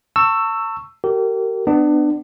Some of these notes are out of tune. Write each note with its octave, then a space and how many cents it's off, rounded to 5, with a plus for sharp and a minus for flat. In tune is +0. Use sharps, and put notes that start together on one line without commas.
A5 +40 C#6 +0 E6 +10
G4 -35 A#4 -30
B3 +25 D4 +25